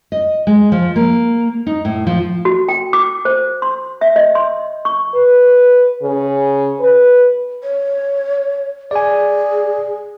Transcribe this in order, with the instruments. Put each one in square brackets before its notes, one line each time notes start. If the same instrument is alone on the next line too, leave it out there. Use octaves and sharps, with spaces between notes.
[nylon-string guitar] D#5
G#3
F3
A#3
D#4
A2
F3
[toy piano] F#4
G5
D6
C5
C6
E5
D#5
C6
C#6
[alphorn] B4
C#3
B4
[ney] C#5
[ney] G#4 [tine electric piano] D5 G#5